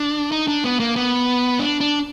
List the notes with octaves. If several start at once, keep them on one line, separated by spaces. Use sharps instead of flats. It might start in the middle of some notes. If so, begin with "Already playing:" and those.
Already playing: D4
D#4
D4
B3
A#3
B3
D4
D4